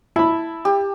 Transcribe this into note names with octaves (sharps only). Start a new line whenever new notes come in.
E4 A5 B5
G4